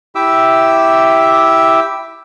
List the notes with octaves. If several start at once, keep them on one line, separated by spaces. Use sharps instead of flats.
E4 G4 E5 D6 E6